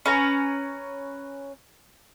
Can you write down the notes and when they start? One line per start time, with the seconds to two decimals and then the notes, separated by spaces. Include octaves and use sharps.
0.06 C#4 B4 A#5